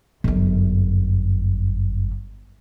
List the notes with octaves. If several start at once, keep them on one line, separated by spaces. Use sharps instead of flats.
G1 F#2